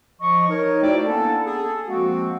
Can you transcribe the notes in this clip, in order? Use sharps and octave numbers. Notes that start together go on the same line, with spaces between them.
F3 D#5 C#6
D#4 A#4 C#5
A3 E4 F#4 C5 D5 G5
A#3 B3 C#4 D4 E4 A4
G#4 A4
F3 G#3 A#3 C4 F#4